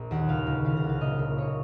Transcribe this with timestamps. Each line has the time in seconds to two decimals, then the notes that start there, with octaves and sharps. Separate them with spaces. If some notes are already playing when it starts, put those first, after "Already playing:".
Already playing: A#1
0.11 D#2 F#5
0.28 C#2 F5
0.47 C#2
0.64 C2 F5
0.77 F#5
0.84 C2
0.89 F5
1.01 A#1 D#5
1.19 A#1
1.38 C2 C#5